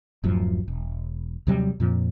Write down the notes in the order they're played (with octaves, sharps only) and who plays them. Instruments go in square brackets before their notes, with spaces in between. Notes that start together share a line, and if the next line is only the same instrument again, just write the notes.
[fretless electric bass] D1 F#2 F3
E1
D#2 C3 F#3 G3
F2 A#2 F3